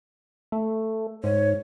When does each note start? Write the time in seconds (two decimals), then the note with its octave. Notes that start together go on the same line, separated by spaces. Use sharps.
0.52 A3
1.24 G#2 C#5